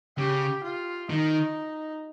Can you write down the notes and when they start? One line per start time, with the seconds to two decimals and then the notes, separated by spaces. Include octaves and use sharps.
0.17 C#3 G4
0.64 F4
1.10 D#3 D#4